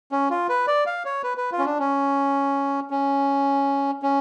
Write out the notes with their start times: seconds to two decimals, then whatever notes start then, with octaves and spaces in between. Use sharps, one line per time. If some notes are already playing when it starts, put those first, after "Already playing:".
0.12 C#4
0.30 F4
0.49 B4
0.67 D5
0.86 F5
1.05 C#5
1.24 B4
1.37 B4
1.52 F4
1.59 C#4
1.65 D4
1.79 C#4
2.91 C#4
4.03 C#4